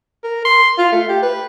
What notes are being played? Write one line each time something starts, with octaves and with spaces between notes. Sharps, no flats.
A#4
C6
F4
A3
G4
B4